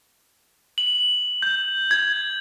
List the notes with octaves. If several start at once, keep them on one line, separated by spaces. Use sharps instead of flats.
F#7
G6
G#6